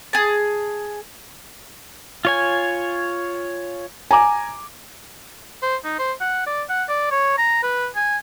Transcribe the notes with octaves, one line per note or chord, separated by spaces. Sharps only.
G#4 A5
F4 C#5 G#5
G#5 A#5 D6
C5
D#4
C5
F#5
D5
F#5
D5
C#5
A#5
B4
G#5